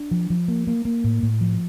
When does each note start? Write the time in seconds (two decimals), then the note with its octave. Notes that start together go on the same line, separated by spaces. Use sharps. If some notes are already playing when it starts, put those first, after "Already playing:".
Already playing: D4
0.11 F3
0.30 F3
0.48 A#3
0.67 A#3
0.85 A#3
1.04 A2
1.23 A2
1.41 F3